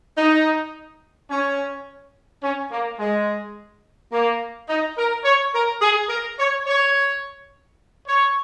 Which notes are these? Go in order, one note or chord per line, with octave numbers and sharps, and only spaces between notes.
D#4
C#4
C#4
A#3
G#3
A#3
D#4
A#4
C#5
A#4
G#4
A#4
C#5
C#5
C#5